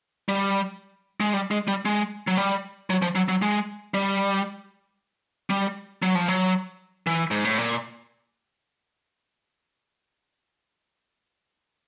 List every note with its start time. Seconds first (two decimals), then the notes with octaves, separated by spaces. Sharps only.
0.29 G3
1.20 G#3
1.34 G3
1.51 G#3
1.68 G3
1.85 G#3
2.27 F#3
2.37 G3
2.90 F#3
3.02 F3
3.15 F#3
3.29 F#3
3.42 G#3
3.94 G3
5.50 G3
6.02 F#3
6.15 F3
6.28 F#3
7.07 E3
7.31 G#2
7.45 A2
7.58 A#2